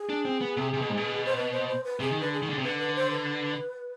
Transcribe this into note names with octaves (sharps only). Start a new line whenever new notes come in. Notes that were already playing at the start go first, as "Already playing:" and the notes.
Already playing: G#4
D4
C4
B3
C3
C3
B2
G#2
B2
C5
B4
C5
C5
B4
C3 G#4
D#3
D3 B4
G#4
D#3
D3
C3
D3 B4
B4
C5
B4